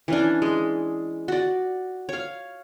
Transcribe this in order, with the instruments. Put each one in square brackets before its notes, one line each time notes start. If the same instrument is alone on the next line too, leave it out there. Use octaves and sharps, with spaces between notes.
[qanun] E3 C#4 D4
G#3
F#4 D5
C#5 F5